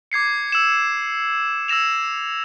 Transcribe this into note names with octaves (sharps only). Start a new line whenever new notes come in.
D6 G#6 C7 C#7
E6 E7
E6 G#6 A#6 E7 F7